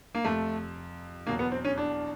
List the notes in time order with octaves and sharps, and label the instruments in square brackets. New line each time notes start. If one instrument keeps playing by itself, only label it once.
[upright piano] A#3
[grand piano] F2 C3 F3 [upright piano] A3
[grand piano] E2 B2 F#3 [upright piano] A#3
[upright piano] B3
C4
C#4
D4